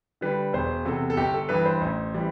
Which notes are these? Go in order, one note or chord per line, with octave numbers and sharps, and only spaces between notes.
D3 G3 B4
E1 C5
E2 C3 A4
A4
G1 G4
A4
G2 E3 B4
C5
A1
E3 G3